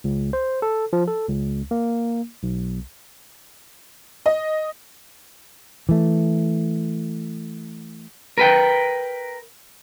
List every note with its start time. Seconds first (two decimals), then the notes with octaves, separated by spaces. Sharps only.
0.04 C#2
0.33 C5
0.62 A4
0.93 F3
1.08 A4
1.28 C#2
1.71 A#3
2.43 B1
4.26 D#5
5.89 E3 A3
8.38 A#4 B4 G5